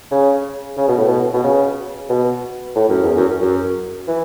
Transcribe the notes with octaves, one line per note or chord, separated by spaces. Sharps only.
C#3
C#3
B2
A2
B2
B2
C#3
B2
A2
F#2
E2
F#2
F#2
E3